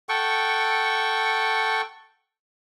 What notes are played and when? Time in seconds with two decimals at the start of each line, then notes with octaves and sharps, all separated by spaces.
0.09 A4 F#5 G5 C#6